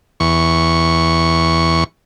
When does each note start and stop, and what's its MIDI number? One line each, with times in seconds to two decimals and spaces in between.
0.20 1.84 40
0.20 1.84 85